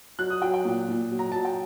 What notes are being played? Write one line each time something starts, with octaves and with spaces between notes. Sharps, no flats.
F#3 F#6
D#6
F#3 G5
G5
A#2
A#2
F#3
A#5
F#3 A5
G5